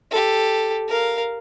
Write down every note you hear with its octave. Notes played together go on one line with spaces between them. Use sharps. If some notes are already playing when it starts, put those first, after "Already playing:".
G4 A4
A#4 F5